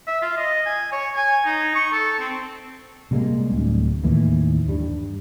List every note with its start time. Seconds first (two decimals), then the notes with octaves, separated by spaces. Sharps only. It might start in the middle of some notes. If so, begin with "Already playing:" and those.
0.07 E5
0.22 F4
0.37 D#5
0.66 G#5
0.92 C#5
1.16 G#5
1.45 D#4
1.75 C#6
1.92 A4
2.19 C4
3.11 C3 G3 G#3 A#3
3.52 D1 D2
4.04 D#2 A2 D#3 E3
4.68 G2 G3